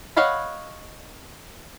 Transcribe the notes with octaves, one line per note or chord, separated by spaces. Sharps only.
C#5 D#5 F5 F#5 B5